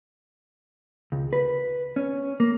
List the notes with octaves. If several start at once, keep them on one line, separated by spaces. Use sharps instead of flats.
C#2
B4
C#4
A#3